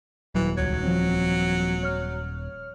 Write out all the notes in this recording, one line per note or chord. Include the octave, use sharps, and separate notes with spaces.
D#1 E3 F#3
C#2 F#3 C#5 G#6
F3 C4
C#5 F6